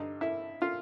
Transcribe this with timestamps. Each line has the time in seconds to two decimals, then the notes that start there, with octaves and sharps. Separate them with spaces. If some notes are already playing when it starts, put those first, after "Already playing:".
Already playing: G2 D3 D#4
0.21 E4
0.62 F4